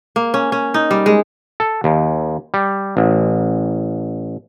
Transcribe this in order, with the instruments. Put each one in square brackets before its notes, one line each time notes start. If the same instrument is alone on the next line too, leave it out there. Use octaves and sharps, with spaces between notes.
[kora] A#3
C#4
C#4
D#4
G3
G#3
[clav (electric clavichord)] A4
D#2
G3
A1